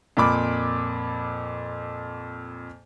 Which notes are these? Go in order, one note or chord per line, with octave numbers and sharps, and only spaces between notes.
F2 A#2 B5 D6